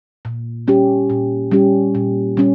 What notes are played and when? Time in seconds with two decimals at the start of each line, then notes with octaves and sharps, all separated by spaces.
0.25 A#2
0.68 G3 C#4 G4
1.10 A#2
1.52 G3 C#4 G4
1.95 A#2
2.37 G3 C#4